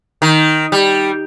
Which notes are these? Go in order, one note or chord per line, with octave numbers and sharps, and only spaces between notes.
D#3
G3